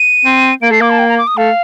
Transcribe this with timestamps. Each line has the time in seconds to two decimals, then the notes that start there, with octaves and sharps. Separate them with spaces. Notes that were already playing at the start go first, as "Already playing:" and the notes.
Already playing: D#7
0.25 C4
0.62 A#3 D7
0.71 A3 C7
0.81 A#3 D6
0.90 A5
0.99 G5
1.09 A#5
1.18 D6
1.27 D#6
1.37 A3 F5